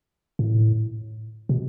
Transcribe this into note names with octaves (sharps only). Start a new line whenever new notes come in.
A2
B2